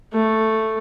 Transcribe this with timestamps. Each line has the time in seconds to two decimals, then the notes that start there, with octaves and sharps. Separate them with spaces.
0.13 A3